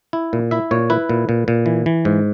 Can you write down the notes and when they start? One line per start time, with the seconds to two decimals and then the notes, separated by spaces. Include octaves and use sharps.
0.13 E4
0.33 A#2
0.51 E4 E5
0.71 A#2 C#5
0.90 E4 B4
1.09 A#2
1.29 A#2
1.48 A#2
1.66 E3
1.86 E3
2.05 G#2